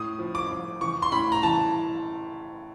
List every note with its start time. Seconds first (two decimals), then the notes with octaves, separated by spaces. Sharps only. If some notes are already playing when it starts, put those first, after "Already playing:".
Already playing: A2 D#6
0.19 F3
0.35 D6
0.50 F3
0.81 E3 C#6
1.02 C6
1.12 A2 B5
1.32 A#5
1.43 E3 A5